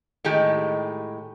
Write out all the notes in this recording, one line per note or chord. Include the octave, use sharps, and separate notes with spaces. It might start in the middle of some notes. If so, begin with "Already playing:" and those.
A2 D#3 G#3 G4